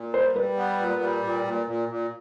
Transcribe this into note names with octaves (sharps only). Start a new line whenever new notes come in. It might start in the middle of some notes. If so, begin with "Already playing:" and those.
Already playing: A#2
G3 C5
G3 B4
B3
A#2
G3
A#2
A#2
A#2
A#2